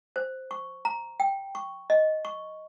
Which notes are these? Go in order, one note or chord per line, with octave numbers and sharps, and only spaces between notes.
C5
C#6
A#5
G5
C#6
D#5
C#6